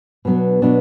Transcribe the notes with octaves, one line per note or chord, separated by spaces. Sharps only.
B2 F#3 B3 D4
B2 F#3 B3 D4